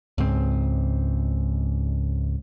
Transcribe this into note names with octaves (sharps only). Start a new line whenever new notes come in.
C#2 G#2 C4